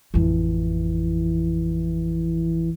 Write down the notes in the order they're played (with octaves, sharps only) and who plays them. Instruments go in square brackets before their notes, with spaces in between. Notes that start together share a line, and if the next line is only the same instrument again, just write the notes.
[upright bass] A1 F2 [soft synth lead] E3